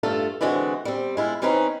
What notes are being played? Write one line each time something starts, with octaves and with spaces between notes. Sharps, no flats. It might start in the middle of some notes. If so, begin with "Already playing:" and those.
G2 A3 F4 A4
D3 E3 G#3 C4 F#4
G3 C4
G#3 E4 F4
E3 C4 C#4 D#4 B4